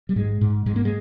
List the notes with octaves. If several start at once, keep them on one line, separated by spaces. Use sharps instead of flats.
G3
G#2 G#3
G#2
G#2 G#3
A#3
G#3